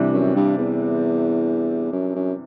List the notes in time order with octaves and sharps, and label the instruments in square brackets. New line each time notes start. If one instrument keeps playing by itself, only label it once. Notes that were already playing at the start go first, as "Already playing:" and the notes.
Already playing: [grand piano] C3 E3 G3 D4
[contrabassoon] F#2
G2
E2
F#2
F#2